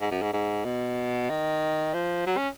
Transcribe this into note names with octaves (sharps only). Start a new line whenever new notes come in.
G#2
F#2
G#2
G#2
B2
D#3
F3
F#3
C#4